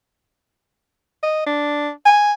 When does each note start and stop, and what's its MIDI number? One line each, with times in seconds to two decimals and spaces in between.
1.23 1.44 75
1.46 1.90 62
2.06 2.33 80